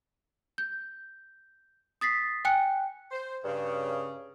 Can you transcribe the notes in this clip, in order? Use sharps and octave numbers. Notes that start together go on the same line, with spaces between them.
G6
D#6 A6 B6 C7
G5 G#5 F#6 C#7
C5
G2 C#3